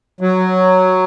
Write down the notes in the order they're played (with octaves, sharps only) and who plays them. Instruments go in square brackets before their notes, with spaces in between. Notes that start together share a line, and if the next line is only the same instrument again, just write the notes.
[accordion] F#3